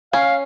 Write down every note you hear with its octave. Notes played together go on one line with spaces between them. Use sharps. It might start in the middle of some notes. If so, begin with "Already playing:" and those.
C#4 F5